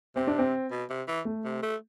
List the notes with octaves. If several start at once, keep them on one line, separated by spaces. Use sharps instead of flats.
C3 C4
D4
C4
B2
C3
E3
A3
C3
A3